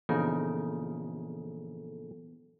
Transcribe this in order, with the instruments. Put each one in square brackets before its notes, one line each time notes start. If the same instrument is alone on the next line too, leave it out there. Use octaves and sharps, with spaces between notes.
[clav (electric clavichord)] A#1 C#3 D#4 [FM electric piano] E3 B3 A4